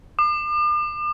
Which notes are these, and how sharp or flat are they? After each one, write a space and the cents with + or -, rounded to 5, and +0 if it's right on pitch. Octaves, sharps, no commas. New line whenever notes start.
D6 +40